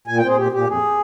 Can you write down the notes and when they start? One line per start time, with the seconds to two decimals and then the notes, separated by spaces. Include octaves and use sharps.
0.07 A#2 G#5
0.17 G5
0.23 C4 G#4
0.37 A#2 G4
0.52 A#2 G4
0.67 F2 G#4